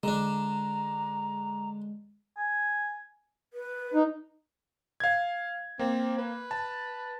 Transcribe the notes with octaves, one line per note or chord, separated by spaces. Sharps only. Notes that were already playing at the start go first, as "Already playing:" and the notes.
D3 G#3 D4 A#5
G#5
B4
D#4
F5 G#6
A#3 C4
B4
A5